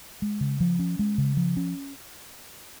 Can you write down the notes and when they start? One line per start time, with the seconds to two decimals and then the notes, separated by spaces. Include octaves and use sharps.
0.22 G#3
0.41 C#3
0.60 F3
0.79 C#4
0.99 G#3
1.18 C#3
1.37 F3
1.57 C#4